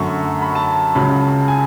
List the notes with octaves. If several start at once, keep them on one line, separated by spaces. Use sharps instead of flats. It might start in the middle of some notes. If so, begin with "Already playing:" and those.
Already playing: F#2 D3 A3 C#6
B5
A5
C#2 C#3 F#3 B5
A5
G#5